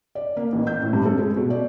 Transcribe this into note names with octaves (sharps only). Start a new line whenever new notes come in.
D5
A#3
A1
G6
A2
G2
A4
G#3
B2
D5